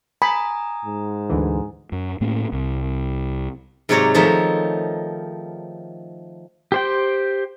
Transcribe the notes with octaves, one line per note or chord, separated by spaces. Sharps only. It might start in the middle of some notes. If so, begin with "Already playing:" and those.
G#5 A#5 B5 D#6
G#2
D2 D3 E3
F#2
A2 A3 A#3 C#4
C2
G#2 C3 F#3 C#5 D5 A#5
D#3 F3 A3 D#4 C#5 E5
G4 C5 G5